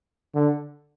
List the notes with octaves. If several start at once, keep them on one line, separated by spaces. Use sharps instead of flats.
D3